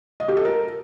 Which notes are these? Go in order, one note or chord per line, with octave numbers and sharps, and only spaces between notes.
D#5
G4
A4
A#4